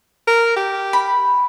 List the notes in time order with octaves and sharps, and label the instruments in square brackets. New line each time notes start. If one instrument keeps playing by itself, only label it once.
[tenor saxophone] A#4
G4
[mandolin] B5